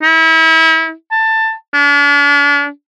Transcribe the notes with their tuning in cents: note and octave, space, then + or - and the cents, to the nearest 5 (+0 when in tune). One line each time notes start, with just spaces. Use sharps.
E4 -35
A5 +15
D4 -40